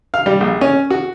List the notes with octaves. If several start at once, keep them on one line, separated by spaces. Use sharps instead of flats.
F5
G3
A#1
C#4
F#4